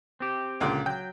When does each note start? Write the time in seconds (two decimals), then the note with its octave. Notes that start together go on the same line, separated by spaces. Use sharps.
0.20 C4 G4
0.60 C#2 A#2 D3
0.86 F#3 G5